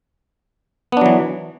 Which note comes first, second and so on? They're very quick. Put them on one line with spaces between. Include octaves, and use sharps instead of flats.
B3 D4 F#3 E3